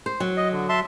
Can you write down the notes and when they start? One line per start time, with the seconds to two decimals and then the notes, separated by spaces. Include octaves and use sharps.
0.06 C5
0.20 F#3
0.37 D#5
0.52 D3
0.69 E5 A5 C6